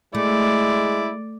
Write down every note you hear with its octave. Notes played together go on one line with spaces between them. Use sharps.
G#3 A3 E4 D5